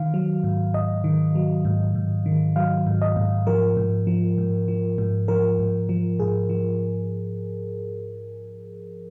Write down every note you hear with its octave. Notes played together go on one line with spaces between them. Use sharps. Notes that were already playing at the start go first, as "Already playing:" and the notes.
Already playing: D#3 F5
F#3
G#2
G#2 D#5
D#3
F#3
G#2
G#2
D#3
F#3 F5
G#2
D#5
G#2
F3 A#4
G#2
F3
G#2
F3
G#2
F3 A#4
G#2
F3
G#2 G#4
F3